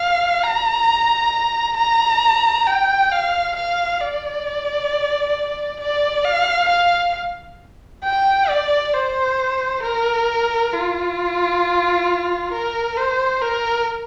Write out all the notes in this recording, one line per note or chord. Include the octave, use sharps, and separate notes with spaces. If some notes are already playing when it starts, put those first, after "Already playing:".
Already playing: F5
A#5
A#5
G5
F5
F5
D5
D5
F5
F5
G5
D5
C5
A#4
F4
A#4
C5
A#4